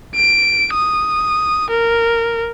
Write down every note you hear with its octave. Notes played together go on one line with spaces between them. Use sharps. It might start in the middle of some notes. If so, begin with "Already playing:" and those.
D7
D#6
A#4